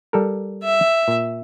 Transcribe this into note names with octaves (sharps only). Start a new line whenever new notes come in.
G3 A4 A#4
E5
A#2